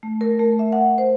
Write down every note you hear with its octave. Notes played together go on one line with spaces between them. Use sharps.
A3
A#4
A3
E5
F#5
C5